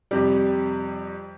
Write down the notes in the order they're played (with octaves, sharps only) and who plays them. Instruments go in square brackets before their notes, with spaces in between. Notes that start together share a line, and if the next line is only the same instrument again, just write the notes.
[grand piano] F2 C3 G3